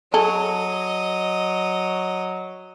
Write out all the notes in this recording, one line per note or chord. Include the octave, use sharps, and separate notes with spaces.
F#3 G#4 A4 D#5